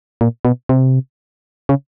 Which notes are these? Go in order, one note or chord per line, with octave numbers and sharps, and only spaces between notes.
A#2
B2
C3
C#3